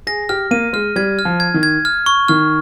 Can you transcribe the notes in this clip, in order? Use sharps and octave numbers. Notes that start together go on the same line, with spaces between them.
G#4 A#6
G4 F6
A#3 D#7
G#3 F6
G3 G#6
F6
F3
G#6
D#3
G#6
F6
C#6
D#3 F6